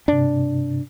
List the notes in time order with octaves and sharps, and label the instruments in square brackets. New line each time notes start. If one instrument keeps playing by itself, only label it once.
[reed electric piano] G2 C3 [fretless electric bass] D4